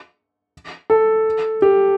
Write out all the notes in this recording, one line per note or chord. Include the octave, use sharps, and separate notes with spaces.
A4
G4